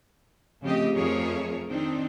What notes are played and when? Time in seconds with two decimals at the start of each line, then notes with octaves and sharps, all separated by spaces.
0.62 C#3 F3 A3 C4 G4 D#5
0.94 F2 F3 A3 G#4 A#4 C#5
1.70 D#3 C4 D4 D#4